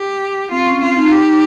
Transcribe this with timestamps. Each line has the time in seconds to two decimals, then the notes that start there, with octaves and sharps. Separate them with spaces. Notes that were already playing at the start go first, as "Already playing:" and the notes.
Already playing: G4
0.51 C4 F4
0.66 C#4
0.81 C4 F4
0.97 D#4
1.12 G4